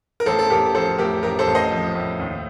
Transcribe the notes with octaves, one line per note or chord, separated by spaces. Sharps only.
A#4
A1 A4 C5
A4
A1 G4 A#4
F3 A4 C5
A2 G4 A#4
A1 G4 A#4
A4 C5
A1
C5 D#5
F3
A2
D#2